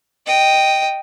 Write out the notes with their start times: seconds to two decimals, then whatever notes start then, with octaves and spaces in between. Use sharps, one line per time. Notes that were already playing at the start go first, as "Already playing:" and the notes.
0.26 D#5 G5